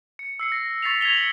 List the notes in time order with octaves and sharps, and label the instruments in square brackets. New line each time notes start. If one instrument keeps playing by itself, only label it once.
[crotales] C#7
E6 C7 C#7
A#6
C#6 A6 B6 C7 F7
G#6 B6 F7 G7
C#7 F#7